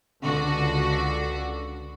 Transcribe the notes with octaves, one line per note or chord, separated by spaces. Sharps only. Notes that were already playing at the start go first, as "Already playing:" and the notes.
C#2 D3 F#4